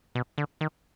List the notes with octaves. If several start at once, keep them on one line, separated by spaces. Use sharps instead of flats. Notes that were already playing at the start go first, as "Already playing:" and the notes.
B2
D3
D#3